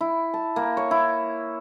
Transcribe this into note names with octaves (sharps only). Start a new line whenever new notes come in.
E4
A5
A#3
C#5
E4